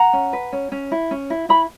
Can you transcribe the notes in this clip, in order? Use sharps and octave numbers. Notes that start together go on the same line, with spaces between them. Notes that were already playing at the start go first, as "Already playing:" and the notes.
Already playing: F#5 A#5
C#4
B4
C#4
C#4
E4
C#4
E4
E4 B5